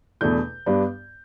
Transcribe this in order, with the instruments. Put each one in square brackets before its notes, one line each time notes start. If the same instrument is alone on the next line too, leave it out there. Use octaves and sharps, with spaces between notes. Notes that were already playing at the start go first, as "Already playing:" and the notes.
[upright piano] E2 B2 A3 D4 G6
G2 G3 B3 D4